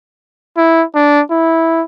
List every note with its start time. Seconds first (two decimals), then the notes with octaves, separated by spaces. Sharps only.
0.57 E4
0.95 D4
1.31 E4